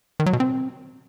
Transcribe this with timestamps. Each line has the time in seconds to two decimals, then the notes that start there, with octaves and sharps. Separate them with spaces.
0.20 D#3
0.26 F#3
0.33 B2
0.40 C4